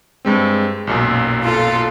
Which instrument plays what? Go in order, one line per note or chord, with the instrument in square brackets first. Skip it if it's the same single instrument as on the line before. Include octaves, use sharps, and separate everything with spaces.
[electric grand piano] G2 G#3 C4
B1 F#2 A#2
[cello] F4 A4